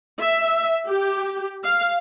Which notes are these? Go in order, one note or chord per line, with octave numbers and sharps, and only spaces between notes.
E5
G4
F5